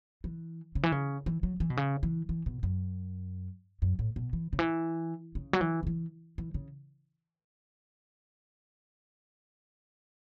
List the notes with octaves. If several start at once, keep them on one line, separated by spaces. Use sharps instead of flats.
E3
C#3
E3
C#3
E3
F#3
E3
B2
C#3
E3
E3
B2
F#2
F#2
A2
B2
E3
C#3
E3
C#3
F#3
E3
C#3
E3
E3
C#3